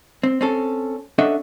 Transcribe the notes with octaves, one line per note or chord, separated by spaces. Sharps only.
C4
C4 C#4 A4
C#4 D4 A4 D#5 E5 F#5